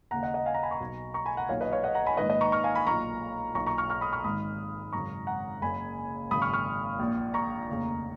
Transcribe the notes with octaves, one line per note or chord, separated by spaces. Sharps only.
D#2 C#3 F#5 A#5
D#5 F#5
D#5 F#5
F5 G#5
F#5 A#5
G#5 B5
A#5 C#6
B1 B2
A#5 C#6
G#5 B5
F#5 A#5
B1 A#2 C#5 F5
B4 D#5
C#5 F5
D#5 F#5
F#5 A#5
G#5 B5
A#1 G#2 D#3 B4 D#5
B4 D#5
A#5 C#6
C#6 F6
F5 G#5
G#5 B5
B1 A#2 A#5 C#6
B1 A#5 C#6
A#2
A#5 C#6
C#6 F6
C#6 F6
B5 D#6
C#6 F6
G#1 G#2 D#3 B5 D#6
G#1 F#2 C#3 A#5 C#6
F#5 A#5
F#1 F#2 C#3 G#5 B5
G#1 F#2 C#3 B5 D#6
C#6 F6
C#6 F6
A#1 A#2
A#5 C#6
F1 D#2 C#3